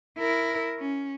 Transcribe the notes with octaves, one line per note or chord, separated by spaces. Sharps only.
E4 A#4
C#4